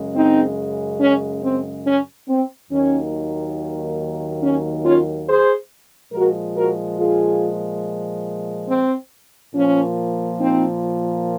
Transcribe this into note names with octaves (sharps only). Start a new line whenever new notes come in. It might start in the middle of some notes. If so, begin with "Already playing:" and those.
Already playing: F#2 C#3 G#3
C4 D#4
C#4
C4
C#4
C4
D#2 D#3 F#3 A#3 C#4
C#4
C#4 F4
G#4 C5
A#2 F3 G#3 F#4 A#4
F#4 A#4
F4 G#4
C4
A#2 F3 A#3 C#4
C4 D#4